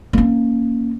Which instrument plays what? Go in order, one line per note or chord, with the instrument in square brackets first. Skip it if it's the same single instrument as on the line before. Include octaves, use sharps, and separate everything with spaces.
[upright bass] A#3 C#4